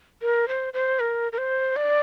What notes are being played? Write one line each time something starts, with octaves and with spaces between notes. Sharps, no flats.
A#4
C5
C5
A#4
A#4
C5
D5